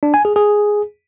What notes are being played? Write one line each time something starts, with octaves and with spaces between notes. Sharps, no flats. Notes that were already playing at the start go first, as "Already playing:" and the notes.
D4
G#5
G#4
G#4